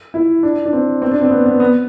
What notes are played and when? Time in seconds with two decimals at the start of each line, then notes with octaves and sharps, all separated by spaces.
0.14 E4
0.43 D4
0.65 D4
0.73 C4
1.02 C4
1.11 D4
1.21 C4
1.31 B3
1.46 B3
1.60 B3